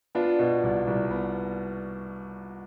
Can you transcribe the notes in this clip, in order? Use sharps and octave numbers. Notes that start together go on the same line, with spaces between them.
B3 D4 F4
B2
C2
C2
B3